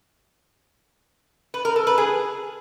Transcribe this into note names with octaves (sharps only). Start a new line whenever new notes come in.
B4
A#4
A4
B4
G#4